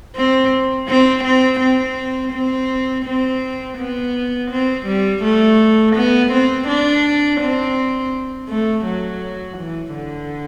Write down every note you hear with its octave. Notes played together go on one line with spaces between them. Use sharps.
C4
C4
C4
C4
C4
C4
B3
C4
G3
A3
B3
C4
D4
C4
A3
F#3
E3
D3